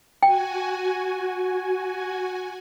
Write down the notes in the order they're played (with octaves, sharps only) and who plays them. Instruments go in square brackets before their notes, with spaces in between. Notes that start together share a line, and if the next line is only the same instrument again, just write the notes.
[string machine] F#4 G#5 [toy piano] G5